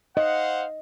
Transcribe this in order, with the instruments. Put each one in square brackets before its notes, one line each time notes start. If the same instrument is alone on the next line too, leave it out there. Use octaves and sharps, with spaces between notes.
[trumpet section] C5 F5 F#5 [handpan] D#5